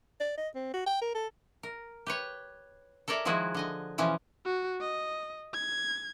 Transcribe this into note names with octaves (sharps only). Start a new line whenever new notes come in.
D5
D#5
C4
F#4
G5
A#4
A4
A#4
G4 B4 C#5
A4 A#4 C#5 D5 E5
D#3 F3 G#3 E4 F#4 G#4
D3 D#5 G#5
B2 E3 F3 C#4
F#4
D#5
G#6